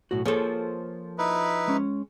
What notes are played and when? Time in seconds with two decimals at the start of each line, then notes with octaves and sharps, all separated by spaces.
0.11 B1 A2 F#4
0.26 F3 A#3 G#4 A4 C#5
1.18 D#4 E4 B4
1.68 G#3 C#4